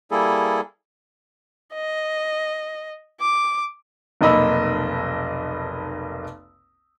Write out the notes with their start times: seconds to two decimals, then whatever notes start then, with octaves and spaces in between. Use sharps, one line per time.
0.11 G3 A#3 E4 G#4 A4
1.73 D#5
3.20 D6
4.21 F1 B1 A#3 D#5 B5 E6